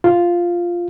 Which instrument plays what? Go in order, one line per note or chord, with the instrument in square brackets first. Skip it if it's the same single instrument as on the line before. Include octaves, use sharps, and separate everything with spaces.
[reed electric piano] F4